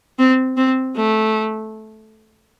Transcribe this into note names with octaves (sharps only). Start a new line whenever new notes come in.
C4
C4
A3